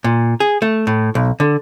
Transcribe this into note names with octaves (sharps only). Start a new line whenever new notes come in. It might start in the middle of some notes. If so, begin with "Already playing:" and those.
A#2
G#4
A3
A2
B1
D3